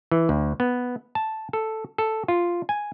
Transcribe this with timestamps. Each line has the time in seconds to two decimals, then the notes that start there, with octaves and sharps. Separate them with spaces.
0.11 E3
0.29 D2
0.60 B3
1.15 A5
1.53 A4
1.98 A4
2.28 F4
2.69 G#5